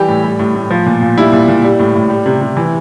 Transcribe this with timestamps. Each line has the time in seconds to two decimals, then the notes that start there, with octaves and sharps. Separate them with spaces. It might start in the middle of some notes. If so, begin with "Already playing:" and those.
Already playing: E3 G3 G4
0.08 A2
0.24 G3
0.40 A2
0.55 A2
0.70 F3
0.86 A#2
1.02 A#2
1.17 G3 E4
1.32 A#2
1.48 A#2
1.64 G3
1.80 A2
1.95 A2
2.10 G3
2.26 C3
2.41 C3
2.57 E3